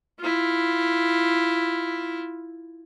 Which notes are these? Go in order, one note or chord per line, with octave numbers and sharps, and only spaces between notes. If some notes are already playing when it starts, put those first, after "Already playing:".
E4 F4